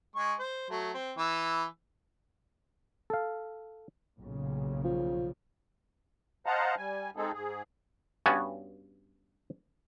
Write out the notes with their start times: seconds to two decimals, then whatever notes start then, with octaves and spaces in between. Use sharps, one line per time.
0.16 G#3 C#6
0.39 C5
0.70 F#3 A3
0.94 C4
1.18 E3 E6
3.10 A4 F5
4.20 B1 A#2 C#3
4.84 F3
6.46 C5 D#5 F5 F#5 A5 A#5
6.78 G3 G#5
7.17 G#3 C4 D#4 G#4 A4
7.33 G#2 G#4
8.26 G2 B3 C#4 F#4 G#5 A5